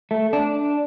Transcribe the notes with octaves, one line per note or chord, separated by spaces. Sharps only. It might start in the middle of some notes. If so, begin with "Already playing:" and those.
A3
D4